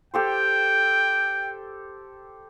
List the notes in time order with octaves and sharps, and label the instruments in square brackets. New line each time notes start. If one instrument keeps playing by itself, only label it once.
[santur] G4 A4 C5 [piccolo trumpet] G5